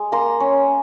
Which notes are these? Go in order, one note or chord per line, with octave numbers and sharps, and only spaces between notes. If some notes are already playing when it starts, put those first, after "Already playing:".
Already playing: G#3
A#3 A#5 C6
C#4